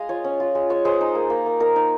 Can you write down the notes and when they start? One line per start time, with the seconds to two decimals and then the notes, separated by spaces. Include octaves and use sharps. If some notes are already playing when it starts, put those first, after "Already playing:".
Already playing: G#3 D#5 F5
0.09 F4 C#5
0.24 C#4
0.40 F4
0.55 G#3
0.70 G#3 C#5
0.85 G#3 C5
1.01 D#4
1.15 A#3
1.30 A#3
1.46 A#3
1.60 D#4 A#4
1.76 D#4